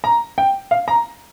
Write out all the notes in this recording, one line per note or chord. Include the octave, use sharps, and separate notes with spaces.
A#5
G5
F5
A#5